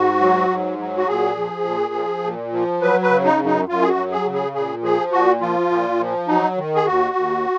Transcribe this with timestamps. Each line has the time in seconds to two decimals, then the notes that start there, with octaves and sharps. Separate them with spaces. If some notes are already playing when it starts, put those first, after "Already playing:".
Already playing: G#2 F#4
0.20 F#3
0.50 G#2
0.79 F#3
0.97 F#4
1.07 A#2 G#4
1.36 F3
1.65 A#2
1.94 F3
2.23 A#2
2.52 F3
2.81 F#3 B4
3.02 B4
3.10 C#3
3.25 D#4
3.39 F#2
3.46 D#4
3.68 F#2 F4
3.82 G#4
3.89 F#4
3.97 F#3
4.11 G#4
4.25 C#3
4.34 G#4
4.54 A#2 G#4
4.83 F3 G#4
5.12 A#2 F#4
5.41 F3 F4
5.71 A#2
5.99 F3
6.28 F#3 D#4
6.57 D#3
6.75 G#4
6.86 D#2 F#4
7.15 D#2